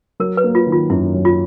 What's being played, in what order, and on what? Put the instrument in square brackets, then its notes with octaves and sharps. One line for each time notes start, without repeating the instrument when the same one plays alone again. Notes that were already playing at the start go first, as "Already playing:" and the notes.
[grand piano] F#3 [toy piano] A#4
[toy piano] B4
[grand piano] A#3
[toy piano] F4
[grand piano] D#3
[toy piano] F4
[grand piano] F#2 [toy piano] E4
[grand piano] F#3
[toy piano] F4